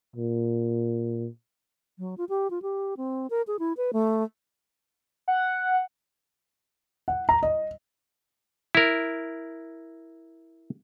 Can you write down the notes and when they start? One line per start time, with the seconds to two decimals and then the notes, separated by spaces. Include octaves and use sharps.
0.16 A#2
1.99 F#3
2.18 F4
2.29 G4
2.50 F4
2.62 G4
2.97 C4
3.30 A#4
3.47 G#4
3.59 E4
3.77 B4
3.93 A3
5.28 F#5
7.08 F#5
7.29 A#5
7.43 D#5
8.75 E4 A#4